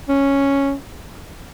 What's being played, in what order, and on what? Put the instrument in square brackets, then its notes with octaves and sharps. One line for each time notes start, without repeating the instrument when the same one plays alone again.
[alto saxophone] C#4